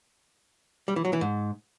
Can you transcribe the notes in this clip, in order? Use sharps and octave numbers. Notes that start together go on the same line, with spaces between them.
G3
E3
F#3
E3
G#2